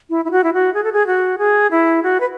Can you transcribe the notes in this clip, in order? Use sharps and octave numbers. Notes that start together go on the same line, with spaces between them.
E4
E4
F#4
E4
F#4
G#4
A4
G#4
F#4
G#4
E4
F#4
B4